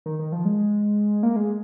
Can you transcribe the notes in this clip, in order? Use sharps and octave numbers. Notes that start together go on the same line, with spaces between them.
D#3
D#3
F3
G#3
A#3
G#3